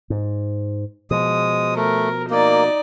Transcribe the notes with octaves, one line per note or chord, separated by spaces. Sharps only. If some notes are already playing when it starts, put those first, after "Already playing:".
G#2
B2 F3 G#3 D#6
A3 A#4
A#3 D#4 D5